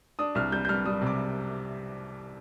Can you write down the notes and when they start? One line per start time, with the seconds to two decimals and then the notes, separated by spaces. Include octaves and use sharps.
0.19 D4 D#6
0.35 C2 F6
0.52 G3 G6
0.65 G6
0.68 G3 F6
0.85 G3 D#6
1.01 C3
1.07 D6